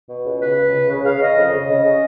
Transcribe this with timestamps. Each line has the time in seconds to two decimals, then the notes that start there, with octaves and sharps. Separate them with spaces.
0.09 B2
0.25 C#2
0.41 C#3 B4
0.57 C#2
0.74 C#3
0.89 C#3
1.05 C#3 F5
1.21 C#3 D#5
1.37 F2
1.53 C#3
1.69 C#3 D#5
1.85 C#3